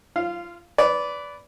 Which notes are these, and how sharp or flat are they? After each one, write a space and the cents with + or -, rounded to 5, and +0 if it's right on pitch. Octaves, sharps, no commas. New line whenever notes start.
F4 -25 F5 +0
B4 +5 D5 -20